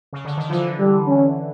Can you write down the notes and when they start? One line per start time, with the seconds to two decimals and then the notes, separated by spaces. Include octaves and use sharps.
0.13 C#3
0.25 D3
0.37 D#3
0.50 D3 E3 F3
0.79 G3
1.07 C#4